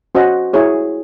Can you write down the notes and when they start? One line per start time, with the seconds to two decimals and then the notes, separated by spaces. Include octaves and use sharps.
0.15 C#4 F#4 C5 D#5 F#5
0.53 E4 G#4 C#5